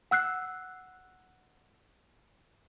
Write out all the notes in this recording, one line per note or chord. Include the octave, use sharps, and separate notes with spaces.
F#5 E6 F#6 C7